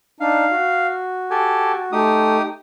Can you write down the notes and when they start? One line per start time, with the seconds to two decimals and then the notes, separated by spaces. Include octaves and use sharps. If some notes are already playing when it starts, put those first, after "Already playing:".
0.20 D4 D#4 F5
0.51 F#4
1.31 G4 A4 G#5
1.92 A3 D#4 G4 D#6